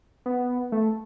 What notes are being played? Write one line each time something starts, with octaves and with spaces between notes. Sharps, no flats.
B3
A3